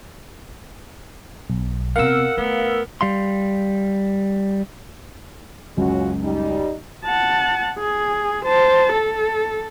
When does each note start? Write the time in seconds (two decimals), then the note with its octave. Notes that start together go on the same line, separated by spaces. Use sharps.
1.50 B1
1.96 C3 B3 A#4 F5 F#5 E6
2.37 A3 B3
3.01 G3 F5 C6
5.77 C#2 F#2 C#4 F4 F#4
6.22 G3 D#4
7.05 F#5 A5
7.79 G#4
8.45 C5 A5
8.92 A4